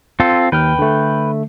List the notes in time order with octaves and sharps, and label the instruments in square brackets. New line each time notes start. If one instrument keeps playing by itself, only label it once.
[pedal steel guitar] C4 F4 A4
[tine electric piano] D#2 F6 [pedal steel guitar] B4 G5
[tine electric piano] D3 A3